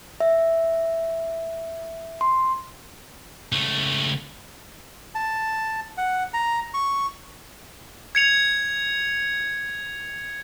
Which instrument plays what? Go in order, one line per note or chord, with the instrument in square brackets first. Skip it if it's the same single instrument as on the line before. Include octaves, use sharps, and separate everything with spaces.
[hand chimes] E5
C6
[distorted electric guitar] C#2 A3
[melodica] A5
F#5
A#5
C#6
[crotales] G#6 C#7 F7